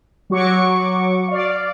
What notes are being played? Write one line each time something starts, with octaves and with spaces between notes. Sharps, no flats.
F#3 F#4 C#6 D6
D5 F5